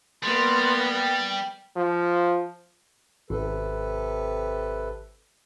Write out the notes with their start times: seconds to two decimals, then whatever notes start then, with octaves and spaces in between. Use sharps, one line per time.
0.23 G3 A#3 B3 C6
0.90 G5
1.76 F3
3.30 G#1 C3 A4 B4